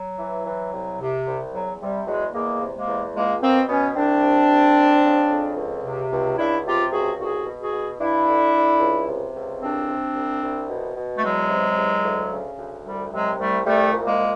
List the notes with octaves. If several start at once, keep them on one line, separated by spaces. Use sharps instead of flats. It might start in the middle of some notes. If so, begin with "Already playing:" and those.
Already playing: F#3
E3
E3
C2
C3
C2
E2 F#3
C3 G3
E2 F#3 G#3
E2 G#3 A#3
C3
G#3 A#3
E2
C#2 G#3 A#3
B2 A#3 C4
B2 B3 C#4
C2 C4 D4
C3
C2
F2
C#3
F2
C#2
C3
C#2
C#2 D4 E4
C3 F4 G4
C#2 F#4 G#4
C2 F#4 G#4
B2
F#4 G#4
B2
G2 D4 E4
D3
D3
C#2
C3
C#2
C2 C4 D4
C3
C2
C2
B2
B2
A3
E2 F#3 G#3
C3
E2
D2
C#3
D2
C2 G3
C3 F#3 G#3
C2 G3 A3
C2 G3 A3
A#2
G#3 A#3
A#2